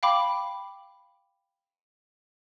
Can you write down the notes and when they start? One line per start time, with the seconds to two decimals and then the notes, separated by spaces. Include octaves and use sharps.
0.03 F5 G5 B5 D6